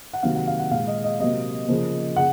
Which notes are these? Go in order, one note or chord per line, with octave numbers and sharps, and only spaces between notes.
F#5
C3 D#3 F#3 A#3 F5
F#5
F5
F#5
A#2 G#3 F5
D#5
D#5
C3 F#3 A#3 D#5
C#3 F3 A#3
C#3 F#5